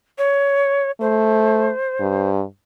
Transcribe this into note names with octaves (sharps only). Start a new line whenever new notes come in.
C#5
A3 C5
G2